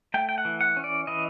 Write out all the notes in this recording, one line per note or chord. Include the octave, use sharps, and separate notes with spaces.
A3 G5
G5
F#5
E3
F#5
C#4
D5
E3 D#5